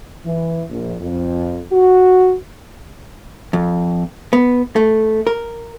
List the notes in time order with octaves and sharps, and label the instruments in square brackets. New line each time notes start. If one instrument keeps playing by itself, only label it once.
[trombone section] E3
A#1
F2
F#4
[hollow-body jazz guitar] F2
B3
A3
A#4